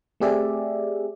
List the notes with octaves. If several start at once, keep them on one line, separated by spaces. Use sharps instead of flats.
A3 C4 G4 G#4 D5 E5